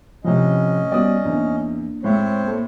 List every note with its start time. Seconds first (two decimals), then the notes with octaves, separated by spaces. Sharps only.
0.25 A2 C3 F3 C#4 D#5
0.92 G3 B3 F#4 D5 D#6
1.25 E2 A#3 D4
2.04 A2 G#3 C4 C5 C#5 E5
2.44 A#3 A4